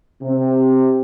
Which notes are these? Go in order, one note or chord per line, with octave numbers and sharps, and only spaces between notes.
C3 C4